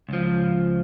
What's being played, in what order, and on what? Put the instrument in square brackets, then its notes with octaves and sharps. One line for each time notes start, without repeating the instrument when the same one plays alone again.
[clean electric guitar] C#2 F3